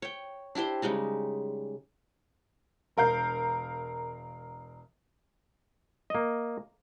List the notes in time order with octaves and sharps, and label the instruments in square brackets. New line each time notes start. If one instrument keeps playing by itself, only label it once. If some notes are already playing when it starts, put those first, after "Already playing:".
[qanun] C#5 G5
D4 E4 G4 C5
C#3 G3 G#3 D#4
[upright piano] E1 A#4 F5 G6
[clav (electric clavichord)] A#3 D#5